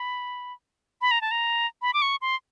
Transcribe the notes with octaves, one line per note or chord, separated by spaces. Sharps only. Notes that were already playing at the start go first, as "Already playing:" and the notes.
Already playing: B5
B5
A#5
A5
A#5
B5
D6
C#6
C6